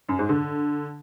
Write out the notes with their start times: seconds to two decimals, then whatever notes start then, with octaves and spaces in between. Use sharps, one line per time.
0.09 F#2
0.19 G#2
0.29 D3